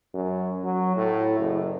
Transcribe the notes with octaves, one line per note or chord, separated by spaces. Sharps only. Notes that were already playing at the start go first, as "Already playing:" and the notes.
F#2
F#3
A2
F#1